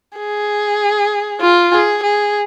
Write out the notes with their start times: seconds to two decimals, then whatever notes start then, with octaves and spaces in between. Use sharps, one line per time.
0.18 G#4
1.41 F4
1.73 G#4
2.03 G#4